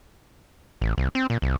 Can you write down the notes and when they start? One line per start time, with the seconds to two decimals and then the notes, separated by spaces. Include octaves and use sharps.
0.82 A1
0.98 C2
1.15 C4
1.30 A#2
1.42 C2